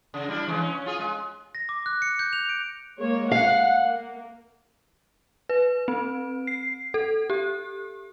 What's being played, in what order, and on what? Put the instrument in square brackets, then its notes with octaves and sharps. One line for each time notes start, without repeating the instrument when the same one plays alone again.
[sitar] C#3
G3 D4 E4
C#3 E3 G#3
C#4
F4 G#4
G#3
[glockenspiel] A#6
D6
F#6
C#7
G6
F7
D7
[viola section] G#3 A#3 C#5
[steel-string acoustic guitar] F5 [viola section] F#5
[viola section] A#3
[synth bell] B4
C4
C7
A4
G4